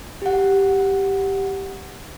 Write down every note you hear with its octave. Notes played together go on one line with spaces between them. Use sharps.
G4 F#5